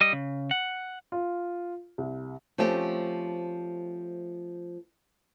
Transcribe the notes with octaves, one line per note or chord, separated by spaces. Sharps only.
G3 D#5
C#3
F#5
F4
C2
F3 A3 C4 C#4 G4